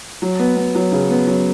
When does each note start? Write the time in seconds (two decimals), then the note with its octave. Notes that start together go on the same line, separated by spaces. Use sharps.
0.22 F#3
0.39 B3
0.56 B3
0.75 F#3
0.92 C#3
1.10 B3
1.27 F#3